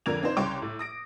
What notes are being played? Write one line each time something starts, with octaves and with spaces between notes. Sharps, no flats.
F2 D3 A#4 D5 G#6 F7
C4 D4 D#4 C5
C2 C#3 C#5 G5 C6 D6
A2
D#6 A#6 D7